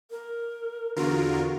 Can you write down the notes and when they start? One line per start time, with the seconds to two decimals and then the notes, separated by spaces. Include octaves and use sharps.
0.11 A#4
0.97 E2 D3 F4 F#4 A#4